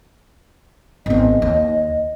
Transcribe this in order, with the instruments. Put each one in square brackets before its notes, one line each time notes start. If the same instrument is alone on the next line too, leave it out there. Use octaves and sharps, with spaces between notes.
[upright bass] G#1 B3 [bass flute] D#5
[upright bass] D#2